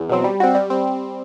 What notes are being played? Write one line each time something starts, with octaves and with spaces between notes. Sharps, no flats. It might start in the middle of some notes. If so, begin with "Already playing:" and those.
Already playing: E2
B2 F#3 C4
G3
C4 F#4
G3
C4